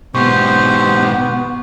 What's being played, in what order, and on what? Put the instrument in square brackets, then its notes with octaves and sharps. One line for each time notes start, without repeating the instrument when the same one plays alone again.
[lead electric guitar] G#2 B2 [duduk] B3 [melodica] G4 C5 [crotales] C#6